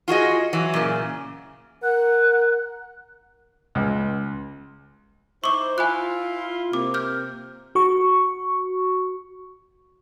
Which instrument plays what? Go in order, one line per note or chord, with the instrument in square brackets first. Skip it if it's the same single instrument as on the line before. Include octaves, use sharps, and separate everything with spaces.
[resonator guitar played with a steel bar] F4 F#4 G#4 D#5
E3 F#3
A#2 C#3
[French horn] A#4 [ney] F#5 [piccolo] F#6
[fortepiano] C#2
[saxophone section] D#4 E4 C5 [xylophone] C#6 D6
[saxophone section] E4 F4 [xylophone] G#5 B5 F#6
[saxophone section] C3 A#3 [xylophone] D6
[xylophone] F6 G6
[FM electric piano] F#4 C#6